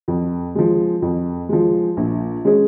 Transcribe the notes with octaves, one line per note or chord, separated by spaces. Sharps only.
F2
F3 G#3
F2
F3 G#3
A#1
G#3 C#4 G#4